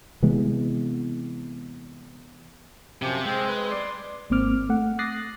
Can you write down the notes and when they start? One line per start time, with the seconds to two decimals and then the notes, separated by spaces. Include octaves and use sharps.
0.22 C3 E3 G#3 B3
3.02 F#2 C3 F3 G4
3.26 G#3 C4 C5
3.48 B4
3.71 D5 C6
4.30 G#1 G#2 A#3 C4 D6 F6
4.69 A3 F#5
4.99 D6 D#6 F#6 A6 A#6 C7